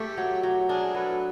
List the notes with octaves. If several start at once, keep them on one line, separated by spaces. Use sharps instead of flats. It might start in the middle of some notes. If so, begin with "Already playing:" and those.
Already playing: A3 G4 A4
F#3
F#3
D4 G#4 A#4
F#3 A4 B4